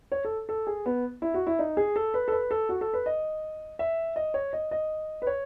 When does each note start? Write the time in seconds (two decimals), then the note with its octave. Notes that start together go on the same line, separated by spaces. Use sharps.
0.12 C#5
0.25 A4
0.49 A4
0.67 G#4
0.86 B3
1.22 E4
1.34 F#4
1.47 E4
1.59 D#4
1.77 G#4
1.96 A4
2.14 B4
2.28 A4
2.32 B4
2.51 A4
2.69 F#4
2.81 A4
2.93 B4
3.06 D#5
3.79 E5
4.16 D#5
4.34 C#5
4.53 D#5
4.71 D#5
5.22 B4
5.27 C#5